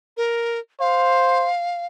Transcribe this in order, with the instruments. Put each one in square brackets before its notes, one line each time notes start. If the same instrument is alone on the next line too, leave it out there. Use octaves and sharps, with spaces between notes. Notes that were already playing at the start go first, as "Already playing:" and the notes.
[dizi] A#4
[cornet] C5 [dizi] F5